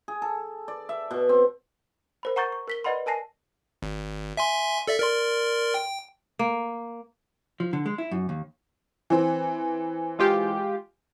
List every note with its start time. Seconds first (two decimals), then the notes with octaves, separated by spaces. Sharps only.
0.08 G#4
0.22 A4
0.68 D5
0.89 E5
1.11 B2
1.29 C4
2.23 A#4 C5 B5
2.36 F#5 A#5 C#6 G6 A6
2.52 C#6
2.68 A#4 B6 G7
2.84 B4 D5 D#5 F#5 B5 C6
3.06 A#4 G#5 A5 A#6 C7
3.82 G#1
4.37 E5 G#5 C6
4.88 A4 D5 E5
4.99 A#4 D5 C6
5.74 G5
6.39 A#3
7.60 F3
7.73 D3
7.86 G#3
7.98 E4
8.11 F#2
8.29 D#2
9.10 E3 C4
10.19 G#3 F4 G4